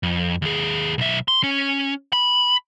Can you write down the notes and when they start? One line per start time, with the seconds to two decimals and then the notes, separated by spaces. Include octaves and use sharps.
0.03 F2
0.42 D#2 G#4
0.98 B1 E5
1.28 C6
1.43 C#4
2.13 B5